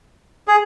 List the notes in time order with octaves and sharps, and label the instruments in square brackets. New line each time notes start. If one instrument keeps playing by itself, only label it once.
[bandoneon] G#4